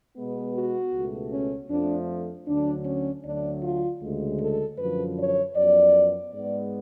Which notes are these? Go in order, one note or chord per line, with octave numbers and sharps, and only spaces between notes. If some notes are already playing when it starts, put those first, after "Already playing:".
B2 G#3 B3
F#4
C#2 B2 A3
C#4
F2 F3 A3 D4
D2 D3 F#3 D4
C#4
D2 D3 F#3 A3 D4
F4
D2 C#3 G#3
A4
F#2 D3 F3 B4
C#5
F#2 F3 B3 D5
G#2 G#3 B3 D5